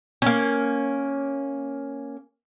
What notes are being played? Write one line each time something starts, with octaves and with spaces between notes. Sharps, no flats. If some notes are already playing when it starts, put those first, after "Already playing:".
A#3 C#4